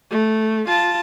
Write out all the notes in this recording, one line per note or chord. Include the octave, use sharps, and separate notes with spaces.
A3
F4 A5